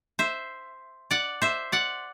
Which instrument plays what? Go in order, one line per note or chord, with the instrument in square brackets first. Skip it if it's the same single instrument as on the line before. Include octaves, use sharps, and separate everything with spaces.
[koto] C5 E5
D5 F#5
C5 E5
D5 F#5